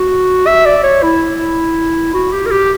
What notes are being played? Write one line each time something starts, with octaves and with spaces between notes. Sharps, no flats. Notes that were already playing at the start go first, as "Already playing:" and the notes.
Already playing: F#4
E5
D5
C#5
E4
F#4
G4
A#4
G4